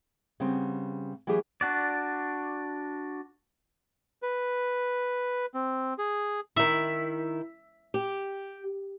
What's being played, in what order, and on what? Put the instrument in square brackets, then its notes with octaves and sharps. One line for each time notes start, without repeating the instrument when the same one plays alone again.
[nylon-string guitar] C#3 G3 B3 C4
E3 F#3 A#3 E4 G4 G#4
[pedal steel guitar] D4 F#4 D5
[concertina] B4
C4
G#4
[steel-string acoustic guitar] D#3 E4 [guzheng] E5
[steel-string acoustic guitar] G4